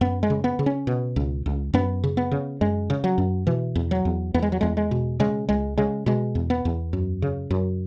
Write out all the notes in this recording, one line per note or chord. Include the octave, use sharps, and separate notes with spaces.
F#2 B3
G#3
C#3
B3
C#3
C#4
B2
C#2
C#2
F#2 B3
C#3
B3
C#3
F#2 G#3
C#3
F#3
F#2
B2 E3
E2
F#3
E2
E2 B3
G#3
F#3
E2 G#3
G#3
B2
C#3 G#3
C#2 G#3
C#3 G#3
B2 G#3
E2
B3
E2
F#2
C#3
F#2